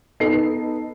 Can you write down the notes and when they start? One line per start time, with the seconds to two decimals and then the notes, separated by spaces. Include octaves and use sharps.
0.20 B3 D#4 A4 C7